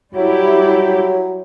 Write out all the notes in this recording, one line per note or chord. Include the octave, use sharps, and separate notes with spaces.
F#3 G3 E4 G4